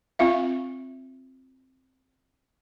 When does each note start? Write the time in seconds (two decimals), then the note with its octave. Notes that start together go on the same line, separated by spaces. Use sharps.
0.19 C4 F4 E5 F5